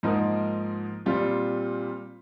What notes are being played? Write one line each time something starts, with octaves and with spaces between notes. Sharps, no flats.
G#2 F3 A#3 D#4 A#4
A#2 G3 C4 F4